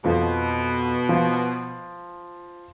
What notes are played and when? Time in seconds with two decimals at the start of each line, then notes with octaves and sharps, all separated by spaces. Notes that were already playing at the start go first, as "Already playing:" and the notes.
0.04 F2 B2 F3
1.09 F3